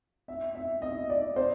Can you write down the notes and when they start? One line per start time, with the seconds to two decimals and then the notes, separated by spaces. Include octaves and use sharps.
0.28 E5
0.55 E5
0.82 D#5
1.10 D5
1.36 C5